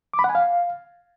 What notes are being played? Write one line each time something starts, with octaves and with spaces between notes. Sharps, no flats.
D6
B5
F#5
G#5
F5